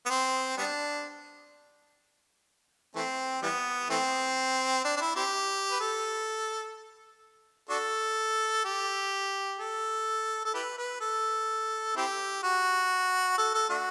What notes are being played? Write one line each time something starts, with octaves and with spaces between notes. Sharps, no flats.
B3
C4
G3 B3 D4
E3 A3 C4
E3 G3 B3
E3 A3 C4
D4
D4
E4
C4 E4 G4
B4
A4
D4 F#4 A4
G4
A4
A4
E4 G4 B4
B4
A4
C4 E4 G4
F#4
A4
A4
A3 D4 F#4